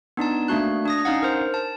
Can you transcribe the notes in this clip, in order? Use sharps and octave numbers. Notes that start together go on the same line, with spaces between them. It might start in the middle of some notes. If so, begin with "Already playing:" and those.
B3 D4 D#4 A5
A3 A#3 D4 F#4 F#6
D4 D#6 A#6
C#4 D#4 F5 F#5
A#4 C5
A5